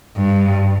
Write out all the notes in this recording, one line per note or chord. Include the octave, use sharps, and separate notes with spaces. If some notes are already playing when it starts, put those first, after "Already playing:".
G2